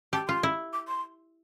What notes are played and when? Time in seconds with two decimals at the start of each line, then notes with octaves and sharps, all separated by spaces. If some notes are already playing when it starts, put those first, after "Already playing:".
0.13 G4 A5
0.28 F4 C6
0.43 E4
0.73 D6
0.88 C6